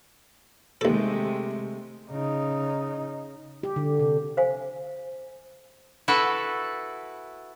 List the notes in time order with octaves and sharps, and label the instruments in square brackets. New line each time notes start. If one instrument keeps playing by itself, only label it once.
[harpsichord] D#2 A4 [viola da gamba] C3 G#3 A3
[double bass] C#3 D#4
[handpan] G4
D3
C3
[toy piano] C5 F5 G#5
[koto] E4 F#4 A4 B4